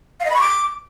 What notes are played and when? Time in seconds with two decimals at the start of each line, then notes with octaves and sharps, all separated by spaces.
0.20 F5
0.25 D#5
0.30 B5
0.35 C#6
0.40 D6